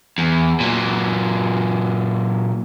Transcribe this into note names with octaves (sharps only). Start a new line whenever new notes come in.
E2
A#2 F#3